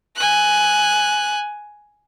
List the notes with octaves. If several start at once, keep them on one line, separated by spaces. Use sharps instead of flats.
G#5 F#6